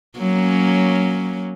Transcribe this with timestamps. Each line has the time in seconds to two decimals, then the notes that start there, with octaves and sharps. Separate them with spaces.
0.18 F#3 A#3 C#4